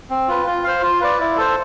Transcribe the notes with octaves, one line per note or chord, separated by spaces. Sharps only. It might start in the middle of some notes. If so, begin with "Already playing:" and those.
C4
F4 B4
F4
C5 F5
F4
B4 D5
E4
A4 C5